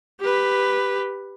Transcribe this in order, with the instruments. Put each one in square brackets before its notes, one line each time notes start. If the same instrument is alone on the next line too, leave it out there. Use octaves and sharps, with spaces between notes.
[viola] G4 B4